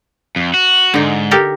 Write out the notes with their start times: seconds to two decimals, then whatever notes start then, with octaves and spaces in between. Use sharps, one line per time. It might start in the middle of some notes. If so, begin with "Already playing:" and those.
0.36 F2
0.54 F#4
0.94 G#2 D3 D#4
1.31 G4 A4 A#4